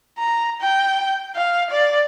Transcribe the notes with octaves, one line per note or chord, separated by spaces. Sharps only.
A#5
G5
F5
D5